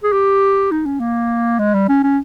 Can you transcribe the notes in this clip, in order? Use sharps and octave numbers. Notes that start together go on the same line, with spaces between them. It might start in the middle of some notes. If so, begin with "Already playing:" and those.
G#4
G4
D#4
C#4
A#3
G#3
G3
C#4
C#4